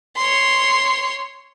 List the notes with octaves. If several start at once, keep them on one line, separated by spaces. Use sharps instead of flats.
C#5 C6